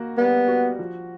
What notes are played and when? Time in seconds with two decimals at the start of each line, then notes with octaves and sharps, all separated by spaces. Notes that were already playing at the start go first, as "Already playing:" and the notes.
Already playing: A#3 F#4
0.18 G3 B3
0.48 F#4
0.79 F3